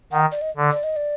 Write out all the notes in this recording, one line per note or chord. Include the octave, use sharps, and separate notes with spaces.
D#3 F#5
D5
D#5
D3
D5
D#5
D5